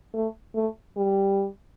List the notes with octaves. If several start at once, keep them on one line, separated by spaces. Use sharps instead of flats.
A3
A3
G3